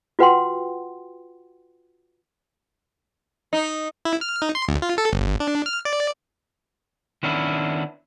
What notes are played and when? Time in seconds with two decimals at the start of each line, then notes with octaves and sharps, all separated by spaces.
0.19 F4 F#4 B4 F#5 G5 C6
3.53 D#4
4.05 E4
4.21 F6
4.42 D#4
4.55 C6
4.68 D2
4.82 F4
4.98 A4
5.13 G1
5.40 D4
5.66 F6
5.85 D5
7.23 D#3 B3 C#4 D4 E4